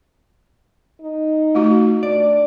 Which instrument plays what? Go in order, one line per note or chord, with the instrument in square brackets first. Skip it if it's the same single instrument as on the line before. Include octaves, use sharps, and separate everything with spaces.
[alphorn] D#4
[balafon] A3 F4 F#4
[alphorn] D4 [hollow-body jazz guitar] D5